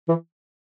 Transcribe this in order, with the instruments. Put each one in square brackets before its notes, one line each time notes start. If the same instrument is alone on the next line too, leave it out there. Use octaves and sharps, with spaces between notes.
[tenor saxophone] E3